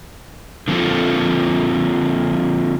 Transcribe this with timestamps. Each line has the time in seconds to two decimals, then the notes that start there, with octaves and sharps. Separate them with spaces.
0.68 D3 F3 A#3 C4 F4 A4